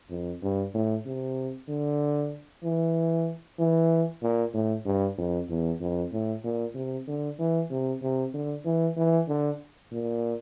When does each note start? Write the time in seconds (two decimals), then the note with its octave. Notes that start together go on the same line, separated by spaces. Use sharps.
0.10 F2
0.43 G2
0.74 A2
1.06 C3
1.69 D3
2.64 E3
3.59 E3
4.22 A#2
4.54 A2
4.86 G2
5.18 F2
5.49 E2
5.81 F2
6.12 A2
6.44 A#2
6.75 C3
7.07 D3
7.39 E3
7.70 C3
8.02 C3
8.34 D3
8.65 E3
8.97 E3
9.28 D3
9.92 A#2